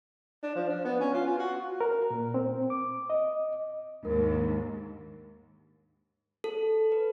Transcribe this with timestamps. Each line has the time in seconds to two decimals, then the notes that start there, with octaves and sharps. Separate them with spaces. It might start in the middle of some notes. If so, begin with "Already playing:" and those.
0.43 D4
0.56 F3
0.69 D4
0.85 B3
1.00 C#4
1.14 F4
1.26 F4
1.39 F#4
1.81 A#4
2.10 A#2
2.34 C4
2.70 D6
3.10 D#5
4.03 D#2 G#2 D4 A#4
6.44 A4
6.92 B4